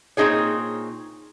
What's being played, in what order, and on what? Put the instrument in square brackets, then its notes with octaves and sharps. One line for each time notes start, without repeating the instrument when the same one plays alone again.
[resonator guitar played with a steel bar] A#2 C4 D#4 G#4 C#5